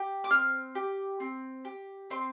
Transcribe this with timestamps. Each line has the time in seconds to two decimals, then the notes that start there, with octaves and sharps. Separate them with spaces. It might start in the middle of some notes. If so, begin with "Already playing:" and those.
Already playing: G4
0.24 D6
0.30 C4 F6
0.75 G4
1.20 C4
1.65 G4
2.10 C4 C6